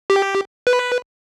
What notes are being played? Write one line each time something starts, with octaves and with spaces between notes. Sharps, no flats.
G4
B4